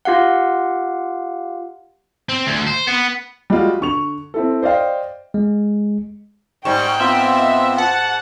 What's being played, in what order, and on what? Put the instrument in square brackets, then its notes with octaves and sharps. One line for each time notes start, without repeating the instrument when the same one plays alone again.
[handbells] F4 G4 F5 F#5
[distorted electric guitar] C4
D2
C5
B3
[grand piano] G3 G#3 F4 F#4
D3 C#6 F7
C4 E4 A4
C5 D5 D#5 F5 G5
[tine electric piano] G#3
[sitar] G#2 [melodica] G3 C#6 [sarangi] G5
[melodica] B3 C4 F4 [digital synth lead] E5
[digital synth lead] F#5 [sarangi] A5